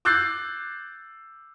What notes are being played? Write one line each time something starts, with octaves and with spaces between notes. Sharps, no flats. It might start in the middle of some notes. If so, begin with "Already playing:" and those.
D6 E6 F#6 G6 A6 C7